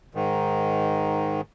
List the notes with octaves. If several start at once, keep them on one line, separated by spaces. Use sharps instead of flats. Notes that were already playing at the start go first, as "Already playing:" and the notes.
G#2 D#3